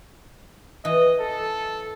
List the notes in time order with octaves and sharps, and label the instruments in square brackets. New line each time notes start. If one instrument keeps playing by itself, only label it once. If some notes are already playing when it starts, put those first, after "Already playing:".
[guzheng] E3 [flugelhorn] D#5
[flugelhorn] A4